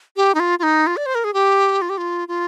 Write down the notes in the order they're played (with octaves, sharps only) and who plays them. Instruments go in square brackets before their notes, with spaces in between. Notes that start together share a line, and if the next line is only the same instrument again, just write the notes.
[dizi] G4
D#4
F4
F4
D#4
F4
D5
C5
A#4
G#4
G4
F4
G4
F4
F4